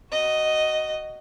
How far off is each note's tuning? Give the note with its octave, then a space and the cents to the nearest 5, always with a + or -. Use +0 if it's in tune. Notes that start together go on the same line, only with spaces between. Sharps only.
F#4 +20 D#5 +0